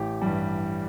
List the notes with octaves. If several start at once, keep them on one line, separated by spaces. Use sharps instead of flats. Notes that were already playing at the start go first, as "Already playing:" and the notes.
Already playing: A1 G4
G2 E3 G3